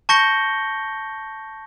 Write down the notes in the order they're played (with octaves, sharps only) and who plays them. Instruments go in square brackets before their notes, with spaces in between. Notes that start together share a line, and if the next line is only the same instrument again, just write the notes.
[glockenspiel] A5 C#6 G6 A#6 C#7 G7